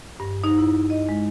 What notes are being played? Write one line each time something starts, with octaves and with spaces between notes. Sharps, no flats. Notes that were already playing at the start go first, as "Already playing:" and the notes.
G2
D#4
E4
D#5
G#3